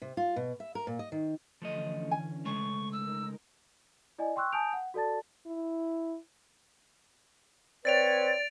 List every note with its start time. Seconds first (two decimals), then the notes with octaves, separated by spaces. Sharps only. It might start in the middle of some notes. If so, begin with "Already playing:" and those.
0.02 C3
0.17 F4
0.36 B2
0.60 E5
0.75 A#4
0.87 A#2
0.99 D#5
1.12 D#3
1.62 D3 E3 F3 A3 C#4 D#5
2.11 G#5
2.45 C#3 G#3 A3 C#6
2.92 D#4 A#4 E6
4.18 E4 D5 D#5 G#5
4.36 G5 C6 C#6 E6 F#6
4.52 G#5 A5 D#6 G6 D7 F7
4.73 F#5
4.94 F#4 A4 D5 A5 A6
5.46 E4
7.85 C4 B4 C#5 D5 A6 D7 F7